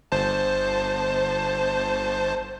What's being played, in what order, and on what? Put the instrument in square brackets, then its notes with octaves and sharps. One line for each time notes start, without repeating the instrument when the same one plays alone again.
[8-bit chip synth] G1 C5 A5